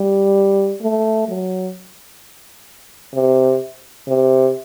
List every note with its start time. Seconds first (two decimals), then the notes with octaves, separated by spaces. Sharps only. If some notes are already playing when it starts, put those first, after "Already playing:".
Already playing: G3
0.82 A3
1.28 F#3
3.14 C3
4.08 C3